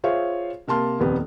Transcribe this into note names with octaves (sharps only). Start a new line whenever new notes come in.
F4 G#4 C5 C#5 E5 F5
C3 A#3 A5 C6 F6
D#1 F2 B3 G4